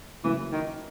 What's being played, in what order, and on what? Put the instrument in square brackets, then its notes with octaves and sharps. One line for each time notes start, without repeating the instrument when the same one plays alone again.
[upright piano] C#3 F#3 A#3 C#4 [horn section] E3
[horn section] D#3